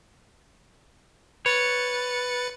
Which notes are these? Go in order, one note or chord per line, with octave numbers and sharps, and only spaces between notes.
B4 C#5 A6 C#7